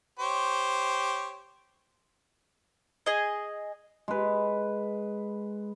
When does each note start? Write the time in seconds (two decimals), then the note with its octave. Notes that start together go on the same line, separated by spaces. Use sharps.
0.19 G4 C5 C#5
3.06 G#4 D#5
4.08 G#3 B4